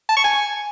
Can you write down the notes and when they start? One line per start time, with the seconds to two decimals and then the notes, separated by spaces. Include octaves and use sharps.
0.09 A5
0.16 C#6
0.24 G#5